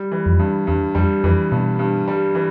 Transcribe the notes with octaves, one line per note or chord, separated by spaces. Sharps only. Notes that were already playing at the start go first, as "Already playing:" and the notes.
Already playing: G3
E3
F2
G2
E2 G2
F2 G3
F2 E3
G2 B2
G2
G3
E3